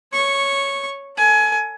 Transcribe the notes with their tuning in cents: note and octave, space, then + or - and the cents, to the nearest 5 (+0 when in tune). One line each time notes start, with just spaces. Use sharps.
C#5 +0 C#6 -10
A4 +30 G#5 +25